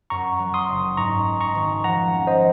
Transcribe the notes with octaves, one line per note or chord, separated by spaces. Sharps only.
F#2 A#5 C#6
F#3
C6 D#6
F#1
G#2 A#5 C#6
G#3
A#5 C#6
G#1
F3 F#5 A#5
C#4
C5 D#5